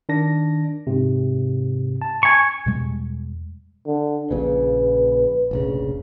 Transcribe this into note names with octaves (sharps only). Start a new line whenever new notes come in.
D#3 D4 A#6
G#2 C3
A5
G#5 C#6
E2 B2 G3 G#3
D3
A#1 A#2 C#3 B4
F1 A#1 C#3